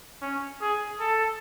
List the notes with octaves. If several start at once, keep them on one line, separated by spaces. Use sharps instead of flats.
C#4
G#4
A4